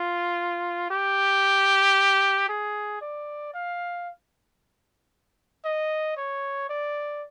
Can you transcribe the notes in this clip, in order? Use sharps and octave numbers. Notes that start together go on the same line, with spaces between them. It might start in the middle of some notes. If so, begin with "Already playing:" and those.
Already playing: F4
G4
G#4
D5
F5
D#5
C#5
D5